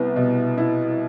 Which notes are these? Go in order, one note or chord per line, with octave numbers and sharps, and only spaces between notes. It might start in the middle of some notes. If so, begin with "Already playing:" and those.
Already playing: C2 B3
B2
E4